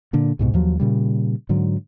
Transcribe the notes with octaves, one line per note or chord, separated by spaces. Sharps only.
A#2 D3
C2 G#2 B2
D#2 F3 F#3
A#2 C#3 G3
G#2 D3 F#3